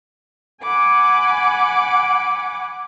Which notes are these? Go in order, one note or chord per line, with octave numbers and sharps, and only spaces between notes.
F#5 G#5 B5 D6